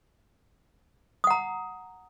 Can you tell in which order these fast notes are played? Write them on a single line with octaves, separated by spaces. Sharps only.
D#6 F#5 A#5